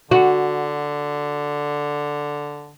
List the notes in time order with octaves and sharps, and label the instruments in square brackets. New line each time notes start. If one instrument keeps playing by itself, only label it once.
[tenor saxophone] D3 [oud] F#4